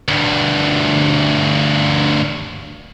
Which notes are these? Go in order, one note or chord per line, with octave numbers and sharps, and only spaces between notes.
D2 G2